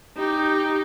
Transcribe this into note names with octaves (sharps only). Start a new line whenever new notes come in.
D#4 G4